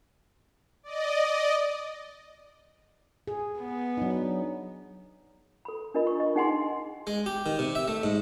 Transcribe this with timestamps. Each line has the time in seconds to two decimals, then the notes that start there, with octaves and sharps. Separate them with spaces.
0.83 D5 D#5
3.27 G#4
3.58 B3
3.97 F#3 D4 D#4
5.65 A4 B5
5.94 D4 F4 A#4 D#5 B5
6.07 C#6
6.20 D#5
6.35 D4 D#4 G#4 F#5 G#5 C6
7.07 G#3
7.26 G4
7.46 D#3
7.59 C3
7.75 E5
7.88 A3
8.03 G#2